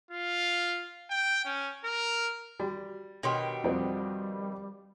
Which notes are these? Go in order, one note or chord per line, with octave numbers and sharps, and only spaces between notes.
F4
G5
C#4
A#4
G3 F#4
B2 D#3 D4 G4 C#5 C6
F2 G3 C4